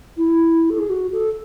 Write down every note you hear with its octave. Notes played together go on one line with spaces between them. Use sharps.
E4
A4
G#4
F#4
A4